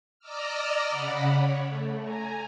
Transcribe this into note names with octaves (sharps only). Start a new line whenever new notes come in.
D5 D#5 A#5 D6 E6 F6
C#3 F#5 B5
C#5
A3
G#5 A#5